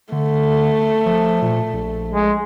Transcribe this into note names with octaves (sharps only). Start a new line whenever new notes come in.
D3 A3
F3
A#2
A#1
G#3